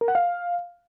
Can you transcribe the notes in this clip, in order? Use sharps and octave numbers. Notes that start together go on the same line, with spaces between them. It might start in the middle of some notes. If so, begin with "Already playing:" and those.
A#4
F#5
F5